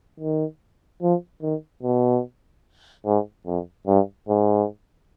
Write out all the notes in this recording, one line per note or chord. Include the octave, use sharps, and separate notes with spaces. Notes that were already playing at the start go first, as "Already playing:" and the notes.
D#3
F3
D#3
B2
G#2
F2
G2
G#2